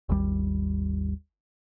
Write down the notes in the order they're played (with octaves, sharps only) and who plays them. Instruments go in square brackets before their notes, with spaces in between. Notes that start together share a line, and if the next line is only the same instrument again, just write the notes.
[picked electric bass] G#1 D#2 G3